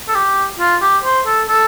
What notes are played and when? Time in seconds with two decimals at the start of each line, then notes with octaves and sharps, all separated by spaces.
0.08 A4
0.15 G4
0.60 F4
0.82 G4
1.04 C5
1.26 A4
1.49 A4